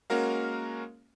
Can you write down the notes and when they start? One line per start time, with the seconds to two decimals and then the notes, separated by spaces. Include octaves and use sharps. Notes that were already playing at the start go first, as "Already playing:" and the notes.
0.10 G#3 A#3 C#4 F#4 A#4 F5